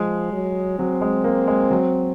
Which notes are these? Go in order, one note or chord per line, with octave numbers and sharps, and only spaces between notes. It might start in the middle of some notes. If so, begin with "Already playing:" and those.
Already playing: F3 G#3
F#3
F#3 C4
G#3
A#3
G#3
F#3